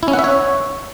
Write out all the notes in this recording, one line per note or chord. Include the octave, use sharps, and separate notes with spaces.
E4
C#4
F#5
E5
C#5